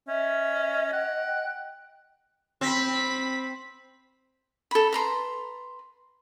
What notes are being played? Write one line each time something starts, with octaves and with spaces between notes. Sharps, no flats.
C#4 D#5 E5
F#5 G5
C4 B5 B6
A4 B5
B4 A#5 C6